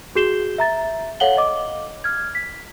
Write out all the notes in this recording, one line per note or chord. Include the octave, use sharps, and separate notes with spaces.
F#4 G#4 G6 C7 E7 G7
E5 A#5 A6
A4 C#5 F5 F#5 F#7 G7
D#5 D6
F6 G#6
B6